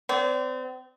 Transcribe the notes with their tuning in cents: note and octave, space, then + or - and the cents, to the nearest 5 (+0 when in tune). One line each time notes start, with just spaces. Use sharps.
C4 -35 D5 -40